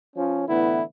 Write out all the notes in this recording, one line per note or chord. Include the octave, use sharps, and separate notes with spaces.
F3 C#4
A2 D3 E3 B3 E4